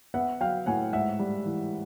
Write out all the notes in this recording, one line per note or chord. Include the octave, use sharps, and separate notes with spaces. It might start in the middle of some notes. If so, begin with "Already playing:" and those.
B3 E5 F#5
F#3 F5 G5
A2 F#5 G#5
G#2 E5 F#5
G3
E3